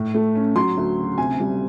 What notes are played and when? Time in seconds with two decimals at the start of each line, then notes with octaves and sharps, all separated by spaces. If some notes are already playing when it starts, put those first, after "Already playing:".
Already playing: A2
0.14 A3
0.35 C#4
0.56 F#3 C6
0.77 D2
0.98 C#3
1.18 C3 G#5
1.40 G3